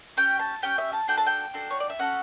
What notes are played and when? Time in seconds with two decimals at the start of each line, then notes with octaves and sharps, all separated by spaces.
0.17 C#4 G4 G5
0.39 A5
0.62 C#4 G4 G5
0.78 E5
0.93 A5
1.08 D4 F#4 A4 G5
1.18 A5
1.26 G5
1.54 D4 F#4 A4
1.71 C#5
1.80 D5
1.90 E5
1.99 C#4 F#4 A4 F#5